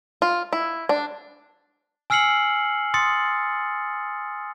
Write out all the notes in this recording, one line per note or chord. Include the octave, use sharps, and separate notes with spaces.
F4
E4
D4
G#5 E6 F6 C7 C#7 F#7
C6 D#6 A6 C#7